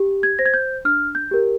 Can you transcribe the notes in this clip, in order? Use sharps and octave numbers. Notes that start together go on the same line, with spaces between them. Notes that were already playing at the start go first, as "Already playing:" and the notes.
Already playing: G4
G#6
C5 A#6
G#6
G6
D4 F6
G6
G4 A#4